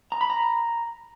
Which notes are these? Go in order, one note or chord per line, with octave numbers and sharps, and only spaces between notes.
A#5
B5
A#5